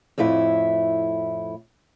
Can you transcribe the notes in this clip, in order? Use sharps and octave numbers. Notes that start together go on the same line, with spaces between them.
F2 A2 A3 E4